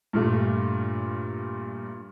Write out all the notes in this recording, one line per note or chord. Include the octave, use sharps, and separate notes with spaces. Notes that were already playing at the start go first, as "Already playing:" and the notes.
G2 A#2 A3